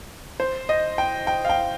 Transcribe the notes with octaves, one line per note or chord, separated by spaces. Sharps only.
C5
D#5
G5
G5
F5
G5